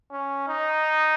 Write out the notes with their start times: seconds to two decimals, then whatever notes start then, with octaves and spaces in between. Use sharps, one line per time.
0.12 C#4
0.48 D#4